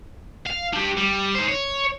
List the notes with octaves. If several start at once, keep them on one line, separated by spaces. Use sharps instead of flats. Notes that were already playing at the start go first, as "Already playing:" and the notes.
F5
D4 G4
G3
D#4 C5
C#5